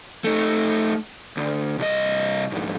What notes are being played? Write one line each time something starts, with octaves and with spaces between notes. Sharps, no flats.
A3 D#4
D2
C2 D#5
F2 G#2